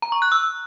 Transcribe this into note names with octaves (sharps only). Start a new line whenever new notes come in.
A#5
C#6
F#6
E6